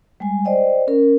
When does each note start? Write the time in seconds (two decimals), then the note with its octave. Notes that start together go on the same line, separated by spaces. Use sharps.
0.20 G3 G#3 G#5
0.45 C5 D5 D#5 G5
0.87 C#4 A#4